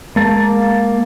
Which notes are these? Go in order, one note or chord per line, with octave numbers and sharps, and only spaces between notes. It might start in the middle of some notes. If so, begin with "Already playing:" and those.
G#3 A#3 A5